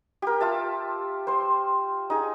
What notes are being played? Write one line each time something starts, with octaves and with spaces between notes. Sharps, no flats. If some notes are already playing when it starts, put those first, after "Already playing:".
G4 A#4
F4 E5 A5
C5 C6
D#4 G#4